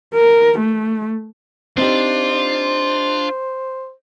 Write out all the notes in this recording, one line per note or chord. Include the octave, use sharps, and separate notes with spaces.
A#4
A3
C4 D4 D#4 F4 G4 C5